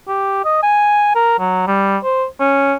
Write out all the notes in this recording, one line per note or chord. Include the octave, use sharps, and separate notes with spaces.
G4
D#5
G#5
A#4
F#3
G3
C5
C#4